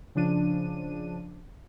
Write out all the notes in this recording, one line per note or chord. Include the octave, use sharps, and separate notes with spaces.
C#3 F3 D4 D#7